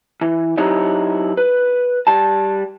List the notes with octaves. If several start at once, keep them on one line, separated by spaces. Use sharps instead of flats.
E3
F#3 D#4 E4 G4 C#5 D#5
B4
G3 A5